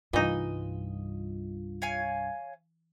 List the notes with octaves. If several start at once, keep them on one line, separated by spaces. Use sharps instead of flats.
C2 G2 E3 D#4 F4 D#5
C#5 F5 G#5